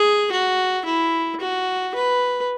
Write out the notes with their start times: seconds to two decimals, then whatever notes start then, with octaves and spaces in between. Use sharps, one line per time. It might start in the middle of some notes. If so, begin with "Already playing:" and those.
Already playing: G#4
0.32 F#4
0.85 E4
1.40 F#4
1.95 B4